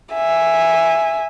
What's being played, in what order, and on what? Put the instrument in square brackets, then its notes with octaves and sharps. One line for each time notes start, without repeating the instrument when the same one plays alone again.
[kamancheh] E5 G#5